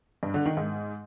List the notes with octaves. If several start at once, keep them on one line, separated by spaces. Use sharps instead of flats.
G2
D3
D#3
G#2